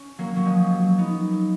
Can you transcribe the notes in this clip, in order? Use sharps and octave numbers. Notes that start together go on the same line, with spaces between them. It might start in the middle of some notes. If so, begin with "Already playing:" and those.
Already playing: C#4
F#3 A#3
F#3
F3 G#3
F#3
B3 D#4